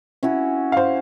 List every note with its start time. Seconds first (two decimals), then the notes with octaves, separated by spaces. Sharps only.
0.23 C#4 E4 F#4
0.72 C5 F5